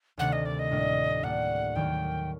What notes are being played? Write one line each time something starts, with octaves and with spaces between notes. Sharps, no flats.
D2 C3 D#3 A3 D4 F#5
D#5
D5
D#5
A2 G3 A#3 D4
A2 G3 A#3 D4 F#5
D#2 D#3 F#3 A#3 G5